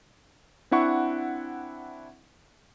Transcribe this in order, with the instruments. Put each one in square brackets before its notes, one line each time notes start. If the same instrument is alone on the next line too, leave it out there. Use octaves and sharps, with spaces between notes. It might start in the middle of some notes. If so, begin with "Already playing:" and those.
[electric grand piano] C4 D4 E4 F#5 C#6